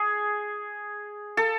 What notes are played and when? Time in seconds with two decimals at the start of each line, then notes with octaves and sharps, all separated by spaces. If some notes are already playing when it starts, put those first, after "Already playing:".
Already playing: G#4
1.37 A4